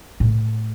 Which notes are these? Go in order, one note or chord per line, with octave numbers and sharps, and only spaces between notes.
A2